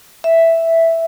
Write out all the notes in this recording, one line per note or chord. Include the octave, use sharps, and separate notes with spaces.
E5